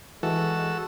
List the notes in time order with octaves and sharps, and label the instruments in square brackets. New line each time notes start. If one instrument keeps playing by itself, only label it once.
[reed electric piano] E3 [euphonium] G#3 [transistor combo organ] F#4 A4 E6